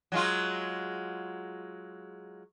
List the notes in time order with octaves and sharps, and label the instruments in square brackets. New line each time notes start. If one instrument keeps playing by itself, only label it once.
[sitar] F#3 G#3 F4